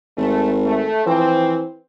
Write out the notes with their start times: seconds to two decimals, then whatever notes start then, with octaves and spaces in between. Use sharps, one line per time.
0.18 G#1 A3
0.64 A3
1.06 E3 F3 C4